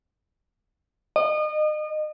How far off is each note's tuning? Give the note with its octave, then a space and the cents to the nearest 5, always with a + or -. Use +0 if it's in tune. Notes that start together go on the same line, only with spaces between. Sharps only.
D#5 -35